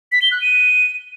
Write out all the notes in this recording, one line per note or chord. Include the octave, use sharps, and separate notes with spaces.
B6
G7
F#6
D#7